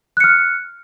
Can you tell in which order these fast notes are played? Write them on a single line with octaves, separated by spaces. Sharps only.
F#6 C#7 F6